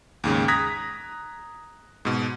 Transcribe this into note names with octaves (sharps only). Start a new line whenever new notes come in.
D#2 G#2 C#3
A#5 D#6 F#6 G#6 A#6 B6
G#2 B2